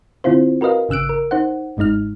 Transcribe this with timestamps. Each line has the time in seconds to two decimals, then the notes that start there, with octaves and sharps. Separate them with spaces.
0.24 D3 C4 E4 F4 C5
0.61 F#4 A#4 B4 D#5 F5
0.89 G#1 C#3 E6 F#6 D7
1.09 A#4
1.31 D#4 C5 F#5
1.77 G1 G#2 G#3 D#4 F6